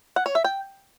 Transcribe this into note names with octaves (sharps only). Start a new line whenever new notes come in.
F#5
C#5
E5
G5